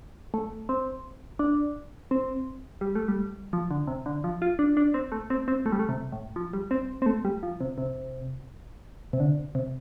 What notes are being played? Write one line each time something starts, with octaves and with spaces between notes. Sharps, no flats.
A3
C4
D4
C4
G3
A3
G3
F3
D3
C3
D3
F3
F4
D4
D4
C4
A3
C4
C4
A3
G3
A3
C3
A2
F3
G3
C4
C4
A3
G3
F3
C3
C3
C3
D3
C3